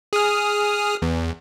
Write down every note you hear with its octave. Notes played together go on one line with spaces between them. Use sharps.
G#4 D#6 F6
E2